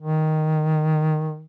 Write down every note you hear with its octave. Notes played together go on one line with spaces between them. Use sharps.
D#3